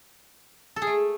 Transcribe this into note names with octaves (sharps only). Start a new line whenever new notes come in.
A4
G#4
A3